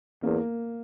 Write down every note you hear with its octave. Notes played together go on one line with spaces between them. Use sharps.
E2 A#3